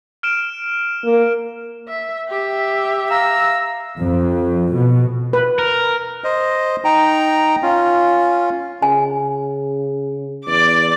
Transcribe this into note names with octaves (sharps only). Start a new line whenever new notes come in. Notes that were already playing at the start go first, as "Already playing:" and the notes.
F6 D7 E7
A#3
E5
G4 E5
F5 A#5 E6
F2
B2
B4
A#4
C5 D#5
D#4 G5 A#5
C#4 F4
C#3 G#5
E2 D5 D6